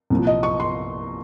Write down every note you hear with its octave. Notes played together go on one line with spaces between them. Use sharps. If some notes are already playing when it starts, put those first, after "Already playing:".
C2 A#2 F3
D#5
C#6
C6